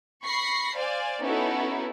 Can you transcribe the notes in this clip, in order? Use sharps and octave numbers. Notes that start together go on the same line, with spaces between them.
B5 C#6 A#6 C7
C5 D5 F5 G#5
B3 C#4 D#4 E4 F#4 A4